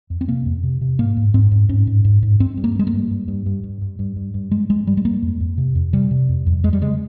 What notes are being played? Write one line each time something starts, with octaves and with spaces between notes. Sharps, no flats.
F2
C4
C3 A#3
F2
C3
C3
G#2 A#3
G#2
G#2 C4
G#2
G#2 C#4
G#2
G#2
G#2
G2 C4
G2
A#3
G2 G#3
A#3
G2
G2
G2
G2
G2
G2
G2
G2
G2
G2 G#3
G2 G#3
G2 G3
G#3
G2 A#3
F2
F2
C3
F2
C3 G3
C3
F2
F2
F2 G#3
G3
C#3 G#3